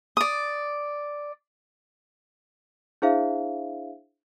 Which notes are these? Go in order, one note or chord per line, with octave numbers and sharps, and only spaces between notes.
D5 D#6
D4 E4 G#4 C5 E5 F5